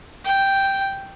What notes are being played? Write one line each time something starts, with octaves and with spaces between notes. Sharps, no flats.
G5